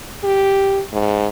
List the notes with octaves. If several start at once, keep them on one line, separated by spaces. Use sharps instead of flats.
G4
G#2